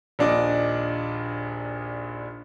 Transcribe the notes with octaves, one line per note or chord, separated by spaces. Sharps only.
A#1 D#2 D4 D5 D#5 D6